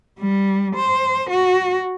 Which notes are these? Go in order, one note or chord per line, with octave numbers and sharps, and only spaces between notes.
G3
C5
F#4